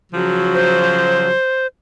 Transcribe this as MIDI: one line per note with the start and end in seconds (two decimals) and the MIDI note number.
0.12 1.30 49
0.12 1.30 53
0.12 1.30 54
0.55 1.67 72